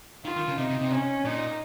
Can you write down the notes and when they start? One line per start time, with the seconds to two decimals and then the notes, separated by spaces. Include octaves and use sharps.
0.24 D#3 F4
0.37 D#3
0.48 C#3
0.58 C3 D#4
0.70 C3
0.81 C3
0.92 C#4
1.25 A#2 D#4